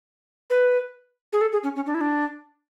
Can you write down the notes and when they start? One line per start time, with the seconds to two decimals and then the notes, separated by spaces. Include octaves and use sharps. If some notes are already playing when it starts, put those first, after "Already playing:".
0.50 B4
1.33 G#4
1.41 A4
1.52 G#4
1.63 C#4
1.76 C#4
1.86 D4
1.95 E4
2.01 D4